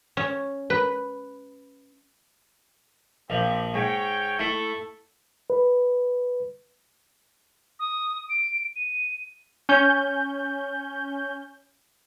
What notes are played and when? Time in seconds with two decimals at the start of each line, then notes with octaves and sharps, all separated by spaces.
0.17 C#4
0.70 B4
3.30 A#1 F3 C4 G4
3.74 G#2 C#5 G5
4.39 A3 E4 A4
5.50 B4
7.79 D#6
8.29 D7
8.76 D#7
9.69 C#4 G6